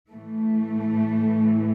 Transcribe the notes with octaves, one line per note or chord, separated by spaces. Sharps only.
A2 E3 A3